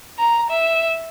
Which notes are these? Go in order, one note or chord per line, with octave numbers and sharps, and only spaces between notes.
A#5
E5